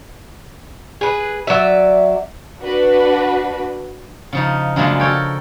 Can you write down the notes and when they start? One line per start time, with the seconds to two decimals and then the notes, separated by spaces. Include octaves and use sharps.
1.01 G#4 B4
1.47 F#3 D5 E5
2.60 D4 F#4 B4
4.33 C#3 F3 D#4
4.76 F#2 C#3 F3 G#3 A#3 D4
5.00 A4 A#4 C#5 G5